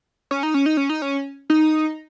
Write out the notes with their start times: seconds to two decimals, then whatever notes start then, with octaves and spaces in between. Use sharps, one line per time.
0.31 C#4
0.43 D#4
0.54 C#4
0.66 D#4
0.77 C#4
0.89 D#4
1.02 C#4
1.50 D#4